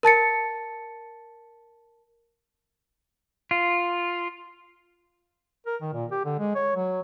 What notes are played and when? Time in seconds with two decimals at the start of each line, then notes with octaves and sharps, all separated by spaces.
0.03 A#4 A5 A6 C#7
3.51 F4
5.66 A#4
5.82 D#3
5.93 A#2
6.11 G4
6.25 D3
6.39 G#3
6.55 C#5
6.76 F#3